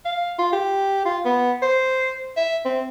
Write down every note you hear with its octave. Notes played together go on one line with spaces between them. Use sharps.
F5
F4
G4
F4
B3
C5
E5
C4